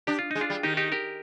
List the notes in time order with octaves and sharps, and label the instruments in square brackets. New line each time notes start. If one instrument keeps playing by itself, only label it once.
[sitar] D4 [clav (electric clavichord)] G4
[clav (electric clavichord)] F4
[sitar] G#3 [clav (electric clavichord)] D#4
[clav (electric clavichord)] D4 F4
[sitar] G3
[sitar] D#3 [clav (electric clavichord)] D#4 G4
[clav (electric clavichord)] D#4 G4
G4 A#4